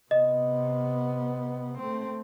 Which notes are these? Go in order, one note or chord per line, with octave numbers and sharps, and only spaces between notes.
C3 B3 D#5
A3 C4